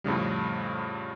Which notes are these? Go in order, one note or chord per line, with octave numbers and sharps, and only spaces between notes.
F2 A2 C#3 G3